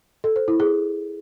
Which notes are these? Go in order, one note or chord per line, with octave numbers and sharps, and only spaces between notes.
A4
C5
E4
G#4